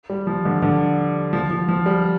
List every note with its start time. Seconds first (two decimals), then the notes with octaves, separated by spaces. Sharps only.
0.10 G3
0.27 F3
0.45 D3
0.62 D3
1.33 F3
1.50 F3
1.68 F3
1.86 G3